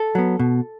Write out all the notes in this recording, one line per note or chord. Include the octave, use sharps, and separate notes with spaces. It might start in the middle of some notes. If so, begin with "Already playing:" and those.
Already playing: A4
F#3 B3
B2